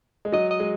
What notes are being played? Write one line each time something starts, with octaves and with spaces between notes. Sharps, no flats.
G#3
F#3 D#5
D#5
G#3